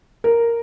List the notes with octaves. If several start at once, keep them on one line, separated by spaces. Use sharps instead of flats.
A#4